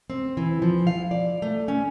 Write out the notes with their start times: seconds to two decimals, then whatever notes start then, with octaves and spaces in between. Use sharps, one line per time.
0.10 C4
0.37 E3
0.62 F3
0.87 F5
1.11 D5
1.42 A3
1.68 C#4